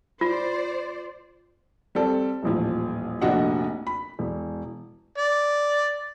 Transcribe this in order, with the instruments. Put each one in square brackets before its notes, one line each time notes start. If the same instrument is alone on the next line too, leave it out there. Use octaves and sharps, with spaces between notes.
[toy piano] F4 [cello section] C5 D5
[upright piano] G3 C4 A4
D#1 A1 F3
F1 A#1 D4 F#4 D#5 F#5
B5
E1
[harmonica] D5